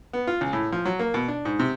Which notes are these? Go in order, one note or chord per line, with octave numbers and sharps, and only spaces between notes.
B3
F4
C#2
A2
F3
F#3
A#3
B2
D4
G#2
C3